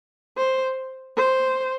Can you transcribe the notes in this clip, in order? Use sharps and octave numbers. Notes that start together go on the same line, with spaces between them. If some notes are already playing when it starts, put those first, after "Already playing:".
C5
C5